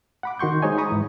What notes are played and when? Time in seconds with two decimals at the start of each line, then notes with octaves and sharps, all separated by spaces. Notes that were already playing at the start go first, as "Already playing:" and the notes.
0.23 F#5 B5 D6
0.39 D#3 F#4 C6 C#6 G6
0.62 G#3 D#4 C5 C#5 D#5 G#5
0.78 A#5 B5 C#6 D#6
0.90 G#2 E3